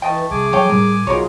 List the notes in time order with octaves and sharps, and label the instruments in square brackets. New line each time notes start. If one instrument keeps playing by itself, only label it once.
[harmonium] E3 A5 [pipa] A3 D#5 G5
[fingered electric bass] C2 [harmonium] G#4 [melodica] G#5 D6
[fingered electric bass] F#3 [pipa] A4 C#5 G5
[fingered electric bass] A2 G3 [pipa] A#4
[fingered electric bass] B1 [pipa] D#4 A#4 C#5 [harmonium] F4 F#4 G#4